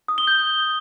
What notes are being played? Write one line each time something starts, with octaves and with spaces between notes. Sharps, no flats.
D#6
G7
G6